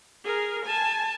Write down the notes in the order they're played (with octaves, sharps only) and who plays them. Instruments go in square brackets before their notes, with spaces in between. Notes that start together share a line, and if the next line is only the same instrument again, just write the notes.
[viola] G#4 A#4
G#5 A5